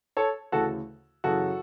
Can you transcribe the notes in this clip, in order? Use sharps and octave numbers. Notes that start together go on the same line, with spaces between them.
A4 C#5
D2 C#3 E3 F#4 A4
F#2 C#3 E3 F#4 A4